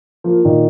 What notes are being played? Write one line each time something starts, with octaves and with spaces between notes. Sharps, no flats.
F3 A#3
A#2 D#3